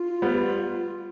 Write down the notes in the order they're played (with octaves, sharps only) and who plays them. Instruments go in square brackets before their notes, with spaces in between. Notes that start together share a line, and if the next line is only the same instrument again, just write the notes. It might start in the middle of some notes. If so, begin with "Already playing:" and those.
Already playing: [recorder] F4
[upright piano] G3 B3